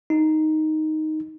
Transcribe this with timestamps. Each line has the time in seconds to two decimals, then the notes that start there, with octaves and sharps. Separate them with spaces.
0.10 D#4